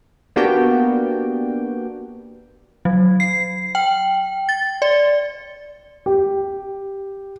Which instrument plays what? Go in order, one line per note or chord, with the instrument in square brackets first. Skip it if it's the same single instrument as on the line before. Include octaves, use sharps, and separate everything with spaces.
[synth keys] A#3 B3 D4 F#4 G4 G5
[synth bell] F#3
C7
G5
A6
D5
[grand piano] G4